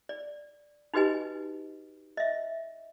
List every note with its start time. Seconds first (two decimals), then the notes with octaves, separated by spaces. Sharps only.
0.09 D5
0.94 D#4 F#4 G4 B4 D#5 G#5
2.17 D#5 E5